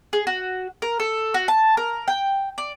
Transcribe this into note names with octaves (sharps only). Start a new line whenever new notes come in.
G#4
F#4
A#4
A4
F#4
A5
A#4
G5
D5